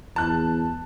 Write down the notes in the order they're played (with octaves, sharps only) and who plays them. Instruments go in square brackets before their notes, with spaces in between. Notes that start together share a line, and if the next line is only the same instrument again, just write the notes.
[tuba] E2 [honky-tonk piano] A5 F#6